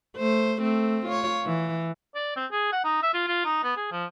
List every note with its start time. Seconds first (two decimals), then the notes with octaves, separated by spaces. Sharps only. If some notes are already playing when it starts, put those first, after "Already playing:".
0.17 A3 C5
0.61 A3 C4
1.05 F4 C#5
1.46 E3
2.15 D5
2.36 C4
2.51 G#4
2.72 F#5
2.84 D#4
3.02 E5
3.14 F4
3.28 F4
3.45 D#4
3.63 B3
3.77 G#4
3.91 F3